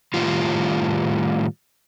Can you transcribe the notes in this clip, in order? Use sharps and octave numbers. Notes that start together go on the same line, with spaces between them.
A2 D#3 G3 F4